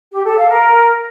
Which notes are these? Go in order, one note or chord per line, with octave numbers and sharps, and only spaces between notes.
G4
A4
F5
A#4